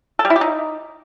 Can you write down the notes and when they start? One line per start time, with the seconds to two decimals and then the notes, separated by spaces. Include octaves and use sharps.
0.19 A4
0.25 G3
0.30 E4
0.36 G4
0.41 D#4